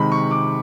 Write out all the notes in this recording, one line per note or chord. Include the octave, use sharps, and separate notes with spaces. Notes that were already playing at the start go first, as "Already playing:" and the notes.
Already playing: C3 D#3 G#3 B5
C#6
D6